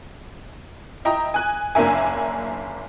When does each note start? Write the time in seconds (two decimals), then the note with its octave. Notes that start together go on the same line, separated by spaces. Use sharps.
1.05 E4 D#5 G5 A#5
1.34 G#5 F#6
1.75 F#1 A#3 D4 A#4 E5 G#5